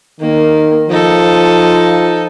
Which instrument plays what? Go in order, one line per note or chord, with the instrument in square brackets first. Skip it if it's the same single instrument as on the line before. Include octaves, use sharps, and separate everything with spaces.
[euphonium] D#3 [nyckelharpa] A#3
[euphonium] F3 [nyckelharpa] D#4 A4